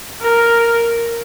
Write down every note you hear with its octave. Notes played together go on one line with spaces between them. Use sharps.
A#4